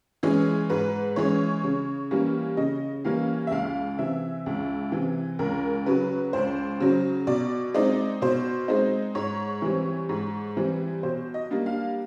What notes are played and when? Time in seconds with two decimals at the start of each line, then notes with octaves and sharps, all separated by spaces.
0.23 E3 G#3 C#4 G#4
0.70 G#2 B4
1.16 E3 G#3 C#4 C#5
1.64 C#3
2.11 E3 G3 A#3 C#4
2.57 C#3 D#5
3.04 E3 G3 A#3 C#4 F5
3.47 E5
3.51 C#2 F5
3.98 C3 E3 E5
4.46 C#2
4.92 C3 E3
5.39 C#2 A#4
5.86 C#3 F#3 B4
6.33 C#2 C5
6.80 C#3 F#3
7.27 B2 D5
7.74 G#3 C4 D#4 D5
8.22 B2 C5
8.68 G#3 C4 D#4
9.15 G#2 C#5
9.62 E3 G3 C4
10.09 G#2
10.57 E3 G3 C4
11.03 B2 C5
11.34 D#5
11.51 G3 A#3 D4
11.66 F5